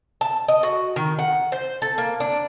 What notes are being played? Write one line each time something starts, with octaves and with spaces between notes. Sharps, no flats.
A5
D#5
F#4
D#3
F#5
C5
A4
A#3
D4